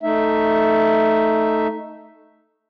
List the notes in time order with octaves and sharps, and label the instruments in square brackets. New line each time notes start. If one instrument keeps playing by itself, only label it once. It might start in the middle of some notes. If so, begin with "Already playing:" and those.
[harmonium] A3 D#4 E5